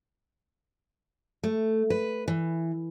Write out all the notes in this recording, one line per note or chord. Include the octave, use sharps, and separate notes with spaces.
A3
B4
E3